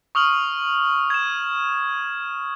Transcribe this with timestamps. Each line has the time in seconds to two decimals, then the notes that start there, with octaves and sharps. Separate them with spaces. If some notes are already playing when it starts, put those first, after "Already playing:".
0.15 C#6 D#6 F6 F#7
1.10 G#6 E7